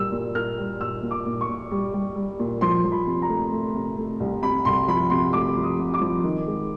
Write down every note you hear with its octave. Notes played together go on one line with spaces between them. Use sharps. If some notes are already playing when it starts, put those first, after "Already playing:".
Already playing: A#2 G3 A#3 E6
A#2
A#3 F6
G3
A#2 E6
A#2
D6
A#2
C#6
A#2
G3
G3
G3
A#2
F3 C6
F3
B5
C3
A#5
A3
A3
C3
A3
C2
C3 B5
C2 C6
F3 B5
C3 C6
A3 D6
F3
D#6
C3
D6
F3
D#3
G#3